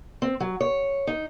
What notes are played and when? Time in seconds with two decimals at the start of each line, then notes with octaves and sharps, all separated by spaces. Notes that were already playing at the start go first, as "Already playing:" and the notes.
0.22 C4
0.40 F#3
0.61 C#5
1.07 D#4